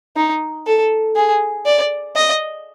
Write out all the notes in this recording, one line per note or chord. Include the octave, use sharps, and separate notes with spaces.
D#4
A4
G#4
D5
D#5